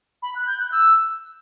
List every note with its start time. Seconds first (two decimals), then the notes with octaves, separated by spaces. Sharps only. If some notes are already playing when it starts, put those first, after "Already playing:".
0.22 B5
0.35 F#6
0.47 G6
0.60 F#6
0.72 E6